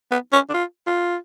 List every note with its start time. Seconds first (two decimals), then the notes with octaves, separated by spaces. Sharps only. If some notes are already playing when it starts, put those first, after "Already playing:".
0.11 B3
0.33 C#4
0.49 D4
0.54 F4
0.87 F4